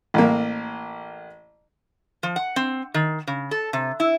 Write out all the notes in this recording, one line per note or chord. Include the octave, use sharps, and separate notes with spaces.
A1 A#3
F3
F#5
C4
D#3
C#3
A4
C3
E4